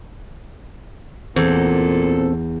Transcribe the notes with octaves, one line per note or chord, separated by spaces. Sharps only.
E2 A#2 C4 A4